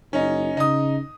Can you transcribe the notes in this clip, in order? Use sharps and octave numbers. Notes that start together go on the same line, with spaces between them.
F#1 C#4 D#4
C#3 D#4 D#6